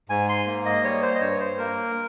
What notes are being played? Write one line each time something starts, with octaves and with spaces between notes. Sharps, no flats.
G#2 G#5
C6
A#3
D#5
G3 C#5
C5
D#5
G2 C#5
C5
A#3 A#4